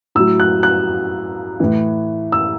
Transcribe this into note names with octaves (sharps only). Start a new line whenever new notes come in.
A2 F#3 E6
F#6
F#6
A2 E3
E6